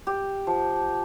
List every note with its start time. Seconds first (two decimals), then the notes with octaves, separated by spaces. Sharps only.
0.07 G4
0.47 F3